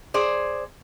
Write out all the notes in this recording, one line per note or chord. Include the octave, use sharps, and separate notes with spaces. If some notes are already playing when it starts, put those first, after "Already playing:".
G#4 C5 D5